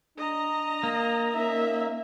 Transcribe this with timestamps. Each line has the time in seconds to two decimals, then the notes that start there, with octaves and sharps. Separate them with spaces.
0.18 D4 D#5 A#5
0.83 A#3
1.34 C#4 D#4 A#4 E5